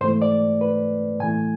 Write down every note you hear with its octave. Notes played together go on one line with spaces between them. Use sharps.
G#2 E3 A3 C5
D5
B4
A2 E3 A3 G#5